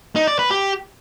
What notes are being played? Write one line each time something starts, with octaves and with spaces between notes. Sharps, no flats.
D#4
D5
B4
G4